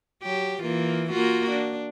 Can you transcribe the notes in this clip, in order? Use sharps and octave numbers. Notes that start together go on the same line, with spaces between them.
F#3 G4
E3 A#3 F4
A#3 F4 F#4
D4